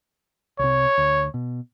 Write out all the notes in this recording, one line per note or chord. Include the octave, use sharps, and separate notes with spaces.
C2 C3 C#5
D2
B2